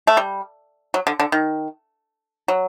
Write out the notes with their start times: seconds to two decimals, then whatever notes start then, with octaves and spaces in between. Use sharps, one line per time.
0.07 A3
0.17 G3
0.94 F#3
1.07 D3
1.20 D3
1.32 D#3
2.48 F#3